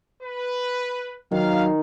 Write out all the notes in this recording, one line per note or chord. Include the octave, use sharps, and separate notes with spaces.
B4
D#3 F#3 F5